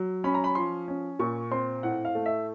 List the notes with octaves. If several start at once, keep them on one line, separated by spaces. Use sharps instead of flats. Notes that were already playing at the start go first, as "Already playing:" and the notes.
Already playing: F#3
C#4 B5
A#5
B5
F3 C6
C#4
A#2 C#6
C4 C6
A2 F#5
F5
A3
E5